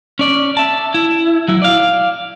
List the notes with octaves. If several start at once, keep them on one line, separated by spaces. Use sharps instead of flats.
C#4 D5
E5 A5
E4
F#3 E4
D5 F5